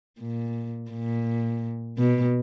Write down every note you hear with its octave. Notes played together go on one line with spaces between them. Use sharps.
A#2
A#2
B2